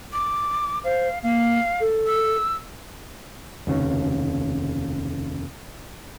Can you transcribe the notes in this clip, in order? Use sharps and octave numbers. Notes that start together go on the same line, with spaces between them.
D6
C5 F5
A#3 F5
A4
E6
F1 D#2 C#3